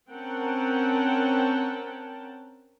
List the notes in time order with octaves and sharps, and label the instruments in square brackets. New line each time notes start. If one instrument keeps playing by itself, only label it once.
[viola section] C4 C#4 A#4 F#5 G5 A5